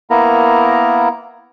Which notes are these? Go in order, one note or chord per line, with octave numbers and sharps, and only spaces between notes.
A#3 B3 E4 A#4 A#5